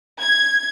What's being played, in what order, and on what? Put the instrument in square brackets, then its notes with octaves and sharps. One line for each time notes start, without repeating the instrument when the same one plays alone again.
[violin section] G#6